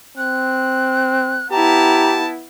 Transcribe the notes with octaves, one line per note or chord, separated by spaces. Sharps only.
C4 F#6
B3 E4 G4 A5 A#5